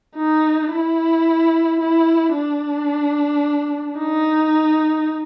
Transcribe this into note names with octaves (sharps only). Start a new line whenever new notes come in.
D#4
E4
E4
D4
D#4